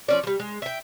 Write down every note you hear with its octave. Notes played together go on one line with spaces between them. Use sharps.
F3 C#4 D5
F3 G3
G#3
E5 G5